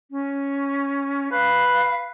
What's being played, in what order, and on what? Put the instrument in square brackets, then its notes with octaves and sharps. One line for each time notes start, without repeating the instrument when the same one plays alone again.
[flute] C#4
[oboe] B4 [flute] F5